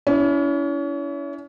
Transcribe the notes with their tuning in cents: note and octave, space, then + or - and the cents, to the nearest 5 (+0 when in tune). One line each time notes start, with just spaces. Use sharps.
C#4 +35 E4 +0